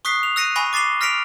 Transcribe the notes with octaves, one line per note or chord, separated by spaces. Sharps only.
C#6 D#6 F#6 B6 C7
F7
E6 F#6 A#6 C#7 D#7
G#5 B5 C#6 E6 A#6
D6 A6 C7 E7 G7
F6 A#6 B6 C#7 D7 F7